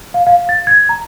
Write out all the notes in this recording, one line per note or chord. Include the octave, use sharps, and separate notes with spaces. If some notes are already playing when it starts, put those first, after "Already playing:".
F5
F5
A6
G#6
A#5